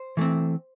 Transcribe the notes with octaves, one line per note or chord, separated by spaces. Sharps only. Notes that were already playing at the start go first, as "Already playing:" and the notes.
Already playing: C5
E3 A3 C4